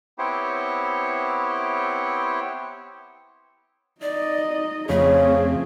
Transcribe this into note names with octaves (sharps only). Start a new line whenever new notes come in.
B3 C4 E4 G4 C5 C#5
D#4 D5 D#5
F2 C#3 A3 C4 G#4